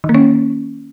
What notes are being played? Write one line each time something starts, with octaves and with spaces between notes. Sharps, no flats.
D#3
A#3
C#4